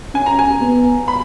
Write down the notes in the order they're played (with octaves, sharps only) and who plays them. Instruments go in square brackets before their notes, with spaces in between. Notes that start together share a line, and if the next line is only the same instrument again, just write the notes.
[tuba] C#4 [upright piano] G#5
[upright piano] A#5
G#5
[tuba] B3
[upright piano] B5